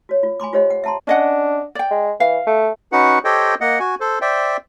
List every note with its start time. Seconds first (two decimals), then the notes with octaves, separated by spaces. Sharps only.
0.09 F#4 C#5
0.23 F4
0.40 G#5 B5 C6 D6
0.53 F4 G4 C5 C#5 D#5 F5
0.70 F#5
0.84 E5 F#5 A5 A#5 C6
1.07 C#4 D4 D#5 F#5
1.75 D5 G5
1.91 G#3
2.20 E3 F5
2.47 A3
2.92 C#4 D#4 F#4 B4 F#5
3.25 G4 A4 C5 C#5 D#5 G5
3.61 A#3 D#5 F#5
3.79 F#4 G#5
4.00 A4 C5
4.21 C5 D5 E5 G5